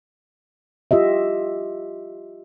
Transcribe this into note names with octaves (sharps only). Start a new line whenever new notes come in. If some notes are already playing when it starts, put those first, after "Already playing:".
F4 G4 D#5 E5